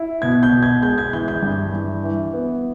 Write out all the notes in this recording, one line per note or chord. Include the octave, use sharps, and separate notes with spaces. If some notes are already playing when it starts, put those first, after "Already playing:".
Already playing: E4
B2 G#6
G6
B2
G#6
G#3 G6
G#6
E3 G6
G6
G2
E3
E3
B3